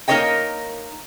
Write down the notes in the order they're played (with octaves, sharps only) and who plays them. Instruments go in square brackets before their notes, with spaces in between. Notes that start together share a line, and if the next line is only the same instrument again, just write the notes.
[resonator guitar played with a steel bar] A#3 D#4 A#4 C#5 D#5 G5